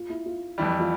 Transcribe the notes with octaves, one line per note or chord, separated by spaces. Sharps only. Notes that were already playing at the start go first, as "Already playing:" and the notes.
Already playing: F4
E4
F4
F2 E3 G3
F4